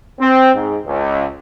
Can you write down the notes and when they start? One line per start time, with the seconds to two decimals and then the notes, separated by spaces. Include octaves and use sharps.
0.21 C4
0.55 G#2
0.86 C#2